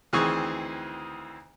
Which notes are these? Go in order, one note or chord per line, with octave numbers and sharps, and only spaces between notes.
D2 D#3 E3 C4 G#4 C#6